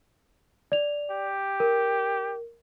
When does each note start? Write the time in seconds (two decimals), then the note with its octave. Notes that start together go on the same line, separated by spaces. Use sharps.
0.72 D5 F7
1.11 G4
1.60 A#4